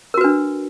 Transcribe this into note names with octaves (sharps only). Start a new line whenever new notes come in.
D4 F#4 A#4 B4